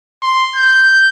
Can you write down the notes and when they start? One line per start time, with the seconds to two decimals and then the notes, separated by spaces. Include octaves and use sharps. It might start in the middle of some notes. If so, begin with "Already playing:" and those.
0.22 C6
0.56 G6